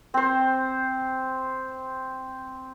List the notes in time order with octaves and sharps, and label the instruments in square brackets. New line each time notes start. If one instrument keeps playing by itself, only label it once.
[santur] C4 C5